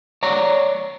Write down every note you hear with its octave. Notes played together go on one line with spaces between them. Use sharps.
C#5 D5 A#5